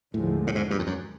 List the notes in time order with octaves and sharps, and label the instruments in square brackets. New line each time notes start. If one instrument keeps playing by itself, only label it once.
[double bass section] D#2 D3 F3 G#3 [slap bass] A2
[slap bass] A2
G#2
G2
F2
F#2